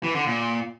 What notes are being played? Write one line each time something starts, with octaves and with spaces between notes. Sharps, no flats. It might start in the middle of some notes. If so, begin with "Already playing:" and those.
E3
D3
A#2